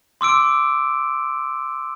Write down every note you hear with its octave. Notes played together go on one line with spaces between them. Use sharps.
C6 D6 E6 D7